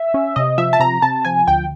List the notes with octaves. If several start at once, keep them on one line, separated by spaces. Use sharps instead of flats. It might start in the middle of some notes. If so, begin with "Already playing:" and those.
Already playing: E5
C#4
C3 D#5
F3 E5
A5
C3 A#5
C3 A5
F3 G#5
D2 G5